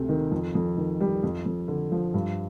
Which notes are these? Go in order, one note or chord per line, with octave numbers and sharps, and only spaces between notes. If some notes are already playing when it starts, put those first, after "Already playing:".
Already playing: D2 C3 A3
D#3
F2
F2
D#3
G3
F2
F2
D3
F3
G2